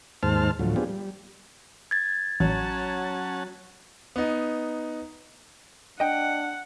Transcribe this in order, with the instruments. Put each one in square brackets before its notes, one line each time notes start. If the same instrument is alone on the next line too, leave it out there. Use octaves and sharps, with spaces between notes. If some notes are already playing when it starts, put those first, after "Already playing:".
[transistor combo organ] D#2 G#2 C5 A5 F6
D2 A2 F3 F#3
B3 C4 D4 F4 G4 G#4
G3
[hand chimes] G#6 A6
[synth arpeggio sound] A1 [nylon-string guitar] F#3 [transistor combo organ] C#4 F#5 A5
[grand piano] B3 D#4
[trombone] D4 [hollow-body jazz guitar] D#5 G5 [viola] F#5